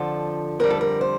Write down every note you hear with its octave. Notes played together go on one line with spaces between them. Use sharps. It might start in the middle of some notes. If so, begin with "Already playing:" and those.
Already playing: F2 D3 F3 A4
F2 D3 G3 A#4
A4
A#4
C5